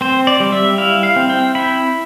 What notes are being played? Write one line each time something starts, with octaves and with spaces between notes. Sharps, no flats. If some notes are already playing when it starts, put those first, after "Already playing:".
C4 C5
D5
G3
E5
E4 F5
F5
C4
G5
E4 B5